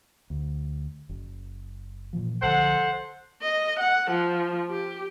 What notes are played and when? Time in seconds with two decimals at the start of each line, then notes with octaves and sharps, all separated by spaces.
0.30 D2
1.09 F#1
2.13 A#2 E3 F3
2.42 B1 D3 F3 A4 C5 F#5
3.42 D#5
3.79 F#5
4.10 F3
4.70 G4